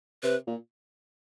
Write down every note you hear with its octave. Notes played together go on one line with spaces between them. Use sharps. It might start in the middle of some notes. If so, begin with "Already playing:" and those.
C3 B4
A#2